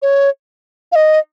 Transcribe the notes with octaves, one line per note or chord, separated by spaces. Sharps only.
C#5
F5
D#5